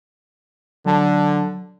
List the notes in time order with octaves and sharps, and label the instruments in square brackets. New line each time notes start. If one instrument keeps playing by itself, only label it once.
[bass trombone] D3 [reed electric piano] F#3 A5